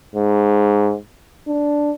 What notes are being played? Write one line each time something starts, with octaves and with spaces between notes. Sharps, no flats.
G#2
D4